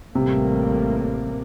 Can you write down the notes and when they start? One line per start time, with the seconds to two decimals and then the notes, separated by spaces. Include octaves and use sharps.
0.15 A1 A2 C3 G3 A#3